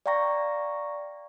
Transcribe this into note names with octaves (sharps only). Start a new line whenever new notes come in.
D5 F5 G5 A#5 C#6 A#6